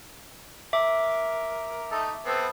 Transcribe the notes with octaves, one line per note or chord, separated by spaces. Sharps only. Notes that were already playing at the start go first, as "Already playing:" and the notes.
A#4 E5 D6
A3 D#4 A4
B3 C4 A4